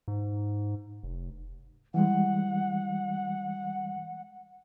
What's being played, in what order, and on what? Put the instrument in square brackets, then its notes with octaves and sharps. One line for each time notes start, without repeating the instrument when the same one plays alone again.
[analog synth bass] G#2
F1
[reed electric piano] E3 G3 G#3 [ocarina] F#5